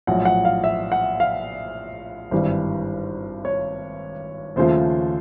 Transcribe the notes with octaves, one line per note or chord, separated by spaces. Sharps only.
A#1 A2 F#3 F#5
F#5
F5
E5
F#5
F5
G#1 G2 E3 G3
C#5
D#2 C#3 F3 A3 C5